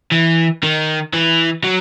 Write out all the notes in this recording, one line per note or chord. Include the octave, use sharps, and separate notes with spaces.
E3
D#3
E3
F#3